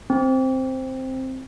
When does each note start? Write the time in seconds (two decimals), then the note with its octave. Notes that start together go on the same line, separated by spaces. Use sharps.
0.10 C4